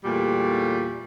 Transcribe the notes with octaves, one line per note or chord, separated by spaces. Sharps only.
E2 A#2 G3 A3